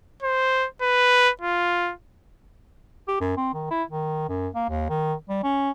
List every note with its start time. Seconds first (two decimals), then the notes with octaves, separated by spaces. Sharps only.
0.23 C5
0.82 B4
1.41 F4
3.08 G4
3.21 F#2
3.37 C4
3.54 D#3
3.71 E4
3.90 D#3
4.29 F#2
4.55 A#3
4.69 D#2
4.90 D#3
5.29 G3
5.44 C#4